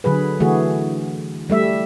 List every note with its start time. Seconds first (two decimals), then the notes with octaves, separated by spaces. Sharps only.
0.04 D3 F#3 G#4 B4
0.40 D3 E3 A3 F#4 G#4
1.50 G3 A3 E5